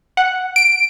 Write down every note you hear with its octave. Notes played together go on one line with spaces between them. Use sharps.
F#5
D7